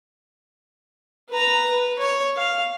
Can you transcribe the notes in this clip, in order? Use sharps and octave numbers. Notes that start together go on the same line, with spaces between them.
B4 A#5
B4
C#5
F5